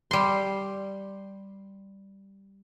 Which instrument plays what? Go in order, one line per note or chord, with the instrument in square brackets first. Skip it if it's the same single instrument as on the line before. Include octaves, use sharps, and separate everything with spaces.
[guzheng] G3 C6